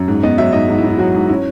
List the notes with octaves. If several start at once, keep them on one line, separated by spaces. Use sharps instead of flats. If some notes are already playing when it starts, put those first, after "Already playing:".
Already playing: F#2
G#2
B3 D#5
F#3 E5
G#2 D#5
G#2
E4
B3
E4
F#3 F#4
G#2
C#4 E4